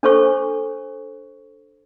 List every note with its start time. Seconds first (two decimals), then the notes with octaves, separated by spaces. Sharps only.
0.03 D4 A4 C5 C#6